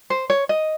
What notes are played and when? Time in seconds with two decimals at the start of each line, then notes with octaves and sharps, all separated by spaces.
0.10 C5
0.30 C#5
0.49 D#5